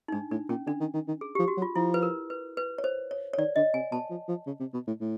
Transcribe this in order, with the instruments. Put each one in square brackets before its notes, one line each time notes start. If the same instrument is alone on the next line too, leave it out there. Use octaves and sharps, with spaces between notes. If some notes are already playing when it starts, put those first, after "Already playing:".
[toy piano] D#4
[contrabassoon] G#2 [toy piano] D4
[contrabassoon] A2 [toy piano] D4
[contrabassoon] A#2 [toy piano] C#4
[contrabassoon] D3 [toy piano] D4
[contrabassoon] D#3
D#3
D#3
[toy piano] G#4
[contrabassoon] F3 [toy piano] G4
[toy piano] F#4
[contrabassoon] F#3
[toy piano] F4
[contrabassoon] F3 [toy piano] E4
[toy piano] B4
A#4
B4
B4
C#5
C5
C#5
C#5
[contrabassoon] D#3 [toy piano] D5
[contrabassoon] D3 [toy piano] D#5
[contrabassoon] C3 [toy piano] G#5
[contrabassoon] B2 [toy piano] A5
[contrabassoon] F3
F3
C#3
C3
B2
A2
A2